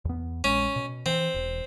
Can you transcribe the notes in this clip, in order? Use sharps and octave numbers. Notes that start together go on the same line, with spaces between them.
E2 B3
A#1 G#3 C#4
B2
E3 C4
E1